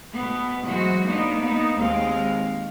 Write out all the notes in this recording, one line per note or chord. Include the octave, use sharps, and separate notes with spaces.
B2 B3
E3 F#3 G#3 F#4 C5
A#3 B3 D4 D#4
A#3 B3 D#4
D#2 G#3 C4 F5